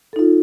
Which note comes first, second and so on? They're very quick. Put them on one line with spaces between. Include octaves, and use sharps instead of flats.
A4 D#4 F4